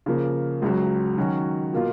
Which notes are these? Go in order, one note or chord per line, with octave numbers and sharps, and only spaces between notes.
C#3 F3 A#3
C#2 C#3 F#3
D#3 F#3 C#4 F#4
B2 A#3 F4